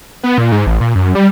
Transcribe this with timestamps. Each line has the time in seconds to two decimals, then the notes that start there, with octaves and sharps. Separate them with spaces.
0.23 B3
0.38 A#2
0.52 G#2
0.66 A1
0.81 A#2
0.95 F#2
1.15 G3